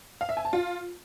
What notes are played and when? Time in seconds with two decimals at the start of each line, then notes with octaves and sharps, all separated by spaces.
0.21 F5
0.29 E5
0.37 G#5
0.45 A5
0.53 F4